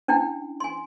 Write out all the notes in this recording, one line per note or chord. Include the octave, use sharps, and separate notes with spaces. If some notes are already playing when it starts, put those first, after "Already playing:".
C#4 D4 E4 G5
G#5 C6